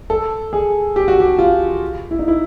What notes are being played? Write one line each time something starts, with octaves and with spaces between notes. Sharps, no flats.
A4
G#4
G4
F#4
G4
F4
E4
D#4
E4